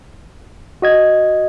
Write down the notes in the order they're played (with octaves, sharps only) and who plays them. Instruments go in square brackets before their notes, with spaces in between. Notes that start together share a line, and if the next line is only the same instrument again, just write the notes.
[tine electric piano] F#4 D#5 G#6